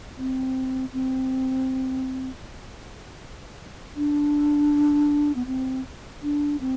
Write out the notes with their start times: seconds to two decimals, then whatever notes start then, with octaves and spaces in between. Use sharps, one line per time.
0.17 C4
0.93 C4
3.96 D4
5.35 B3
5.47 C4
6.22 D4
6.61 C4